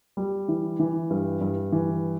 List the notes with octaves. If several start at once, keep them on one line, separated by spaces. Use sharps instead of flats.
G3
E3
E3
G2
G2
E3